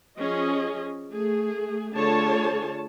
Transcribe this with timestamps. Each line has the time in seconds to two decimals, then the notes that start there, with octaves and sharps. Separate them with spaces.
0.20 F3 C#4 G#4 D#5
1.13 A3 G#4
1.95 D3 A3 F4 G#4 C#5 A5